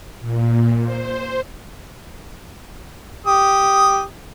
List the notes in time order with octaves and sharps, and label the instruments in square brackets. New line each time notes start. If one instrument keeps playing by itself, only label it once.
[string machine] A#2
C5
[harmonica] G4 D#6